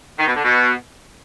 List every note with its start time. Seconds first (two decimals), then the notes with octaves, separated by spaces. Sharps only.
0.19 D#3
0.27 B2
0.35 D3
0.43 B2